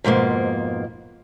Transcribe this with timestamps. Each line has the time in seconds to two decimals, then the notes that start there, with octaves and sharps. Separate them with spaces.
0.04 F2 G#2 B2 A#3